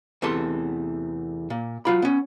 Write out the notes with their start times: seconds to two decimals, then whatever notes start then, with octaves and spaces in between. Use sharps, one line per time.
0.22 E2 C3 E3 A3 A4 C6
1.50 A#2
1.85 F#3 F4 B5
2.02 B3 C#4